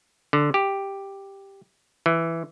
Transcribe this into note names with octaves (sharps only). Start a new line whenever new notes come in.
D3
G4
E3